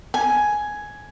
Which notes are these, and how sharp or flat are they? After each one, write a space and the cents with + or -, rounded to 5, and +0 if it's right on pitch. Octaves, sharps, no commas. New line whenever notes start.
G#5 +5